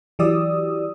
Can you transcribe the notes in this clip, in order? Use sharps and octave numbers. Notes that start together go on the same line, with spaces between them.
E3 F#3 G4 D5 D#6 E6